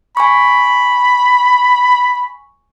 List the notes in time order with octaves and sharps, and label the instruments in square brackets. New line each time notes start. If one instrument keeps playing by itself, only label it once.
[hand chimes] G#5 C#6 [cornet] B5